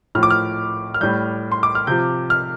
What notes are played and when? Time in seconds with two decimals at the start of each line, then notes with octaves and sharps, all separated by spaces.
0.15 A2 F3 F6
0.23 D6
0.30 F6
0.94 F6
1.01 A2 G3 G6
1.52 C6
1.63 D6
1.75 F6
1.87 C3 F3 G6
2.30 F6